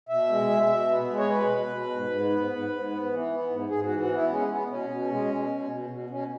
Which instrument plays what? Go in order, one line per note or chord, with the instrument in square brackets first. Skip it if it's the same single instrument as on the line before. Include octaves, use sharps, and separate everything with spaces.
[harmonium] B2 E5
G#3
B2
B2
B3
G#3
C#5
B2 B4
B2
B2
G#2
G#2
B3
G#2
G#2
B3
E3
B3
G#2
G#2 G#4
F#4
E3
F#4
B3 E4
G#3 C#4
B3
B2 C#4
B2
G#3
B2
B2
B2
B2
B2 C#4